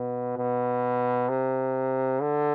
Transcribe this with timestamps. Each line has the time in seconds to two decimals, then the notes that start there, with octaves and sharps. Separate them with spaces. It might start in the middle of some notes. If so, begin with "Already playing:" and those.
Already playing: B2
0.37 B2
1.29 C3
2.22 D3